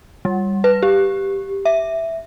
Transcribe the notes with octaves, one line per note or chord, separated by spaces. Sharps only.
G3
B4
G4
E5